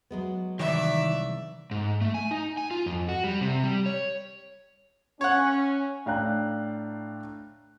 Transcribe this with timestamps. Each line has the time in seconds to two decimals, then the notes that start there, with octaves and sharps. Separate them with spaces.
0.11 F#3 G#3 B3
0.59 C2 F#2 D#3 E3 D5 E5
1.71 G#2
2.01 A3
2.14 G#5
2.31 D#4
2.57 G#5
2.71 F4
2.86 F2
3.09 F#4
3.24 G3
3.41 C3
3.63 G3
3.86 C#5
5.21 C#4 C#5 F#5
6.06 A2 D4 F5 G5 A#5 F#6